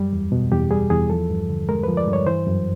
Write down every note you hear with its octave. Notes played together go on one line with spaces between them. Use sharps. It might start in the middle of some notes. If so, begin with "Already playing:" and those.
Already playing: F#2 G3
E2
B2
E2 G4
G3 G#4
E2 G#4
F3 A4
G2
D3
G#3 A#4
F3 B4
D5
G2
C#5
E3 C5
F#2